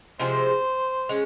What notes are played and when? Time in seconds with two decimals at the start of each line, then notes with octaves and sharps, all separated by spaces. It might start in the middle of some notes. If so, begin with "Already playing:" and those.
0.19 C3 F3 G#3 C4 C5
1.09 G#3 C#4